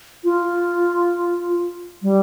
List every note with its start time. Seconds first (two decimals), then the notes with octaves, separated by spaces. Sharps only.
0.24 F4
2.02 G3